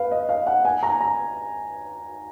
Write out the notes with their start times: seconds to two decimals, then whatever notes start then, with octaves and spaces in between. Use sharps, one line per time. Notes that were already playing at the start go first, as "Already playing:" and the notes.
Already playing: B4 F5
0.11 D#5
0.29 F5
0.47 F#5
0.65 G#5
0.83 A#5
1.01 A#5